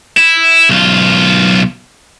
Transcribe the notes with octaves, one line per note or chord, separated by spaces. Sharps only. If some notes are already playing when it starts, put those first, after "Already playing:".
E4
B1 F4